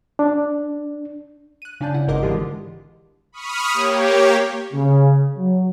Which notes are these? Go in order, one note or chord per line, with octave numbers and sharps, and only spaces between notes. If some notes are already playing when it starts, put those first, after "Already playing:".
D4
F#6 D#7
C#3 D4 D5 A5 G6
E4 F#5
G#1 G#2 A#4 D#5 C6 D6
D3 E3 G#3 F4 G4
B5 C#6 D#6 F6
A#3 G4 C#5
C#3
F#3